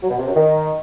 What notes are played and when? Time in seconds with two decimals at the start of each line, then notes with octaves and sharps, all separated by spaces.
0.01 F#3
0.09 B2
0.17 C3
0.26 F#2
0.34 D#3